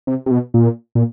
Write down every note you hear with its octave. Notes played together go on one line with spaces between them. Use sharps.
C3
C3
B2
A#2
A#2